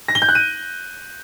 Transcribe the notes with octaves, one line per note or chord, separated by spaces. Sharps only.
A#6
G7
G6
F#6
D#7